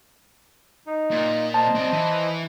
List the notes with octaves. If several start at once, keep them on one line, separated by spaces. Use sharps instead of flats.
D#4
A#2
C5 D#5 A5
C4 D5
E3